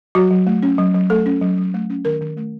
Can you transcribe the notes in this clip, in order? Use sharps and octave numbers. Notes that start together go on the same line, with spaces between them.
F#3 F#4
F#3
A3
C#4
F#3
F#3
A3 A4
C#4
F#3
F#3
A3
C#4
D#3 A#4
D#3
A3